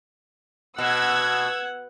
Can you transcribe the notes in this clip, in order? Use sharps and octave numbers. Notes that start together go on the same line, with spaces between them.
B2 F#5 E6 G#6